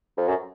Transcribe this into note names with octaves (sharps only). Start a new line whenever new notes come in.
F2
F#2